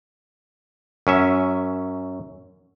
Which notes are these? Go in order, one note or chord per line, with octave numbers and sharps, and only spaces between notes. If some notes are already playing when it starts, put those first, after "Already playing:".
F#2 C#4 E5